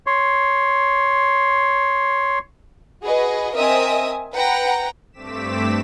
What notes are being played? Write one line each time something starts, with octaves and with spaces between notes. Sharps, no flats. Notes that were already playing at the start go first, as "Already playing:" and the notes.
C#5 C6
F#4 G#4 B4 D#5
C4 A#4 D#5 E5 G#5 D#6
B4 F#5 G5 A#5
G2 A3 C4 D6 B6 E7